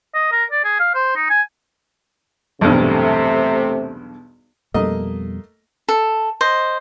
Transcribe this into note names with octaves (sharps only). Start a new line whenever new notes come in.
D#5
A#4
D5
G#4
F5
C5
D#4
G#5
B1 E2 G2 C3 A3
F2 B2 G3 A3 A#3 D#5
A4
C5 D#5